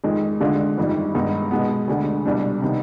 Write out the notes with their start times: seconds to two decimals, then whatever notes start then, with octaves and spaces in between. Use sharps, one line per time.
0.04 F2 D#3 G#3
0.41 D3 G#3 D4 F4
0.78 G1 F2 D#3 G3
1.15 G2 D#3 G#3 B3 D#4
1.51 B2 G#3 B3
1.88 D2 D3 G#3 D4
2.25 C2 B2 G3 D4
2.62 C3 D#3 B3 D#4